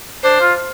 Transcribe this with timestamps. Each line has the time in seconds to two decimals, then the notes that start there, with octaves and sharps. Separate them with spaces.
0.23 D4 C5
0.41 F4